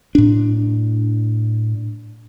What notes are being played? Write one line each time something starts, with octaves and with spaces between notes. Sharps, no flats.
A2 D4